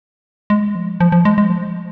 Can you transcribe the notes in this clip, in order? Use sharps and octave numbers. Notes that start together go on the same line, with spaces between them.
G#3
F3
F3
F3
G#3
G#3
F3